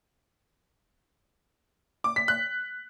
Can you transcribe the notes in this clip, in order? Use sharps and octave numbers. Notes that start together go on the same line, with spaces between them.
D6
B6
F#6